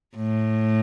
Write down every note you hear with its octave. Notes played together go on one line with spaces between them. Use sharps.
A2